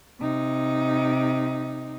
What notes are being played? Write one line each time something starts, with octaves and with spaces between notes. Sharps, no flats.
C3 D#4